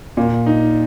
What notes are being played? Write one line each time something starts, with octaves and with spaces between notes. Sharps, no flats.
A#2
D#4